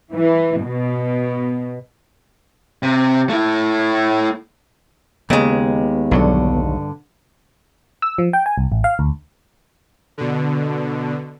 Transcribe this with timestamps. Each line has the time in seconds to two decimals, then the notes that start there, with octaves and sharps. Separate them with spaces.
0.12 E3
0.63 B2
2.83 C3
3.30 A3 E4
5.30 D#2 C#3 G#3 B3
6.11 B1 G2 D3 F#3
8.02 E6
8.18 F3
8.33 G5
8.46 G#5
8.58 C2
8.72 A1
8.84 F5
8.99 D2
10.18 B2 D3